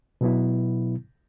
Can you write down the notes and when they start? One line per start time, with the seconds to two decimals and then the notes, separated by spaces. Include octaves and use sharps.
0.21 B2 F#3 B3 E4